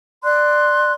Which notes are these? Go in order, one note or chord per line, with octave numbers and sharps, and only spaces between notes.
D5 C6 F#6